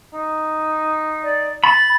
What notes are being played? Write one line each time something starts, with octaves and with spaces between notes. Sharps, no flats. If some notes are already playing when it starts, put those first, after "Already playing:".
D#4
D5
B5 A6